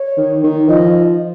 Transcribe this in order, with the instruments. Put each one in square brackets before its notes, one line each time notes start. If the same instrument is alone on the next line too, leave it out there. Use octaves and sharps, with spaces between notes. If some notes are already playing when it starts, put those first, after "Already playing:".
Already playing: [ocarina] C#5
[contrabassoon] D#3
D#3
[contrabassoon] F3 [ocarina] D#5